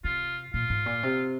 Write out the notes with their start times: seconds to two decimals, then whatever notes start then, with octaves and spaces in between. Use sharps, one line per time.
0.04 C3 F4
0.53 A#2 F4
0.70 G#2
0.86 A#2
1.03 C3